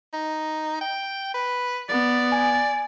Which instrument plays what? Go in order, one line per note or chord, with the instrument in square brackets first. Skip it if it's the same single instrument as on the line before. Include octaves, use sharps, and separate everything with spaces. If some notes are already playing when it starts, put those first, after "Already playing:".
[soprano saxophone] D#4
G5
B4
[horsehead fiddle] B3 [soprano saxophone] D5
[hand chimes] G#5